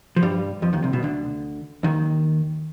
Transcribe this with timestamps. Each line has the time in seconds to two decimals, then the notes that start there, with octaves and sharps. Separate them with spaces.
0.16 F3
0.22 G2 G3
0.62 F2 F3
0.73 D#2 D#3
0.83 C2 C3
0.93 B1 B2
1.03 D2 D3
1.83 D#2 D#3